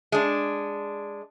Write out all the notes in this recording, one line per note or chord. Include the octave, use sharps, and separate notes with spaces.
G#3 D4